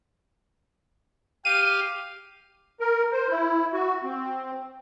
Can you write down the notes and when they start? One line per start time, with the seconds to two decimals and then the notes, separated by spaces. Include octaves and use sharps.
1.45 G4 F5 D#7
2.80 A#4
3.12 C5
3.29 E4
3.73 F#4
4.04 C4